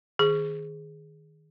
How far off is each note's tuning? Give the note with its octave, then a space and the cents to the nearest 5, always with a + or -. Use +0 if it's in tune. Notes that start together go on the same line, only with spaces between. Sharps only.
D#3 -5 G#4 +0